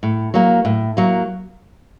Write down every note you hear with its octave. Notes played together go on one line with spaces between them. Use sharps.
A2
F#3 A#3
A2
F#3 A#3